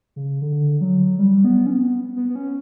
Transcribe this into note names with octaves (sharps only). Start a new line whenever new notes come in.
C#3
D3
F#3
G3
B3
C#4
B3
B3
B3
C#4